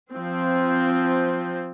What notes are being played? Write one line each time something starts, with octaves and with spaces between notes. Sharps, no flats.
F3 C4